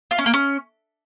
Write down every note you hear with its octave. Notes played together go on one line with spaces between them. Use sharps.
F4
C#4
A#3
C#4